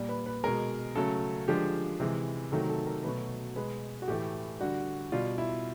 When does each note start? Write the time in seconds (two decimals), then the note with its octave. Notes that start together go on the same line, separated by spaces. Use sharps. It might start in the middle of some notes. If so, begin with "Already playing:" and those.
Already playing: A#2 G3
0.09 B4
0.26 B4
0.44 B2 G#3 A#4
0.95 C#3 F#3 A3 A4
1.48 D3 F3 G#3 G4
2.00 C3 E3 G#3
2.52 C3 D#3 F#3 A3 A4
2.69 A4
2.87 A#4
3.04 B2 F#3 A3 B4
3.56 B2 G#3 B4
4.02 F#4
4.08 A2 E3 A3 G4
4.60 D3 G3 F#4
5.12 B2 G3 F4
5.38 E4